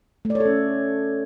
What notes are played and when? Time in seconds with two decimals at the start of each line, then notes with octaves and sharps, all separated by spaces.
0.25 A3
0.30 D5
0.35 C#5
0.40 A4
0.45 C#4